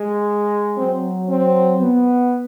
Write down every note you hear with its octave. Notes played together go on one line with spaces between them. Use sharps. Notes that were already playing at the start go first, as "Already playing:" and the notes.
Already playing: G#3
F#3 C4
C4
B3